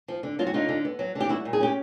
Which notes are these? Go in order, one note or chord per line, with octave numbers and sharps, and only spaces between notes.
F3
D3
F#3 F4
F#4
D3 D#4 F4
D3
B3
F#3
D3
G4
G3 E4 F#4
A#2
G#4
C#4 G4